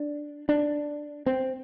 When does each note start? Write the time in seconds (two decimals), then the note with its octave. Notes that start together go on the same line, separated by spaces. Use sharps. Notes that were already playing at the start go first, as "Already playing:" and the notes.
Already playing: D4
0.49 D4
1.26 C4